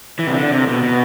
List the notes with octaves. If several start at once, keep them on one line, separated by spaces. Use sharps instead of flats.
E3
C3
D3
C3
B2
B2